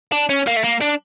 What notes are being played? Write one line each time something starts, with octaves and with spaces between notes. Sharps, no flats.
D4
C#4
A#3
A3
A#3
D4